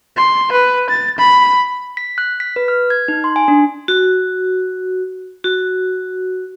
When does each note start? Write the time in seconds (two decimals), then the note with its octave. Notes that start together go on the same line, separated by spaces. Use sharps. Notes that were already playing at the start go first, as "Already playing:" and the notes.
0.17 C6
0.52 B4
0.90 A6
1.18 B5
1.97 B6
2.18 F#6
2.40 B6
2.56 B4
2.68 F6
2.90 G#6
3.08 D#4
3.24 C6
3.36 G#5
3.48 D4
3.88 F#4
5.44 F#4